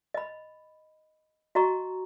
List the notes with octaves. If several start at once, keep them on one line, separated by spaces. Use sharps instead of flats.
D#5 B5
F#4 D#5 A#5 C#6